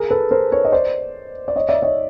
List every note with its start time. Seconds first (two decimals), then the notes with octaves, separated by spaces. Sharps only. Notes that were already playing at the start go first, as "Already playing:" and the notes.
Already playing: G#4 A#4
0.11 A4 B4
0.31 A#4 C5
0.52 B4 C#5
0.65 D#5
0.72 C5 D5
1.48 D5
1.56 C#5 D#5
1.69 D5 E5
1.83 C#5 D#5